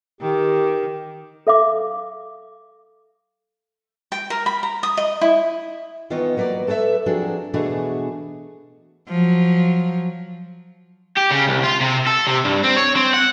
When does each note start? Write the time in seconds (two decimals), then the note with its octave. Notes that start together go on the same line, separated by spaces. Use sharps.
0.21 D#3 G4
1.47 A4 E5 F5 D6
4.12 G5
4.30 A#4
4.46 B5
4.63 A#5
4.83 D#6
4.97 D#5
5.21 E4
6.10 D#3 E3 B3 F4 C#5 D#5
6.37 F#3 A#3 B4 C#5 D5
6.67 A3 A4 B4 C#5 E5
7.06 F3 F#3 C4 D4 F#4 G#4
7.54 B2 E3 A3 D4 F#4 G#4
9.08 F3 F#3
11.17 G4
11.32 C#3
11.49 C2
11.65 F4
11.81 C3
12.07 A4
12.27 C3
12.45 G2
12.64 C4
12.77 C#5
12.96 C4
13.13 F#5